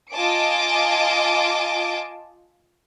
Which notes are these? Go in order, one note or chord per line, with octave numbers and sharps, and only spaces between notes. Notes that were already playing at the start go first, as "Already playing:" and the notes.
F4 D#5 G#5 A5 D6 D7